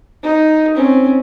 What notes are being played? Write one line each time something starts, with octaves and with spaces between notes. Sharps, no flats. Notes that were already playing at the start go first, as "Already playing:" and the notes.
D#4
C4 C#4